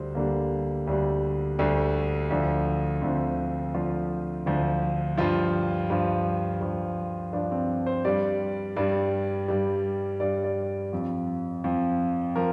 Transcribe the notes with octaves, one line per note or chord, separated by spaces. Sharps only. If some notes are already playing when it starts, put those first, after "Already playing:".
Already playing: D2 D3 G3 C5
D2 D3 G3 A#3
D2 D3 G3
D2 D3 G3
D2 D3 F3
D2 D3 F3 C4
D2 D3 F3 F4
D2 D3 F3
G2 F3 F4
G2 F3
G2 F3
G2 F3 D4
C4
C5
G2 G3 D5
G2 G3 D5
G2 G3
G2 G3 D5
D5
F2 F3
F2 F3
F3 A#4